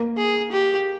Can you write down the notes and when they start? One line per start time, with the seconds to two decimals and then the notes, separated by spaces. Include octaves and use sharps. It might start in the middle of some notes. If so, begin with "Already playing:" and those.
Already playing: A#3
0.18 G#4
0.52 G4